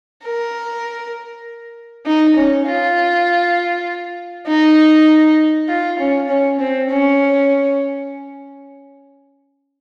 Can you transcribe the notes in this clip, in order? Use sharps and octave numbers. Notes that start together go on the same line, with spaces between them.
A#4
D#4
C#4
F4
D#4
F4
C#4
C#4
C4
C#4